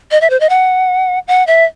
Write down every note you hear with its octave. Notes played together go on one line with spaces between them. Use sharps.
D#5
E5
C5
D#5
F#5
F#5
E5